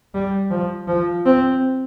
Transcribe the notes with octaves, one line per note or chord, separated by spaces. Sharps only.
G3
F3
F3
C4